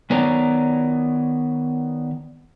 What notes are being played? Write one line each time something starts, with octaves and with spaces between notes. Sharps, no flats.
D#3 B3 C#5 D5 A#5